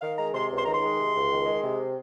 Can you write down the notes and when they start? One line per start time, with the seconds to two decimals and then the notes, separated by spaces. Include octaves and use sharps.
0.01 D#3 F5
0.18 G#3 A#5
0.34 C3 C6
0.50 C#2
0.58 C6
0.65 D#3 A#5
0.74 C6
0.82 G#3
0.99 C3
1.15 C#2
1.30 D#3
1.46 G#3
1.63 C3